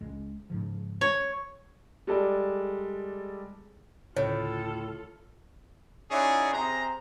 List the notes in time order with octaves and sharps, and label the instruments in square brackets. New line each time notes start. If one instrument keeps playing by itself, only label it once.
[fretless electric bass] C#2 G#3
G#2 C#3 F3
[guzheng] C#5
[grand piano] G3 G#3 A4 D5
[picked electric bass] D2 C#3 [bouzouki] A2 [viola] F4 A4 [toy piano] C#5
[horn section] C#4 D#4 E4 F#4 G#4 D5
C3 G#4 C5 A#5